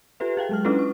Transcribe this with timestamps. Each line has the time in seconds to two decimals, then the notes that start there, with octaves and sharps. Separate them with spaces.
0.20 F4 G4 A4 B4 E5
0.37 G#4 F5 G5
0.49 F#3 G#3 F6
0.65 C#4 D4 E4 F4 A4 B4
0.79 C#6